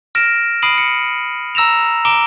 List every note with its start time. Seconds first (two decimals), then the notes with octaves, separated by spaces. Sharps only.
0.15 F6 A#6 D7 E7
0.62 B5 D#6 C7 D7 D#7 F#7
0.78 C#7
1.55 A#5 E6 A#6 E7 F7
2.05 A#5 D6 D7 E7 G7